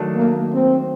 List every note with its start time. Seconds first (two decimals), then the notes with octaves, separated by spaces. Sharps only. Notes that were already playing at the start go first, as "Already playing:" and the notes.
Already playing: D#3 F#3 A3 D4 A4
0.15 A#3
0.53 C4